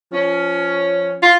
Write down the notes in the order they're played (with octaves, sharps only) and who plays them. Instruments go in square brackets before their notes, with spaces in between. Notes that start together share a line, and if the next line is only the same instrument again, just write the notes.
[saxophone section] F3 C#4
[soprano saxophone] F4